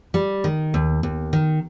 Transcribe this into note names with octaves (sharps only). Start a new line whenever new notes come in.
G3
D#3
D#2
D#2
D#3